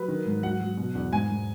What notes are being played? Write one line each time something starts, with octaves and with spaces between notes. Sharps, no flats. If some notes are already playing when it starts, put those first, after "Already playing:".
Already playing: F#3 B4
D#3
G#2
F#3 F#5
F#3
B2
E2
G#2 G#5
G#2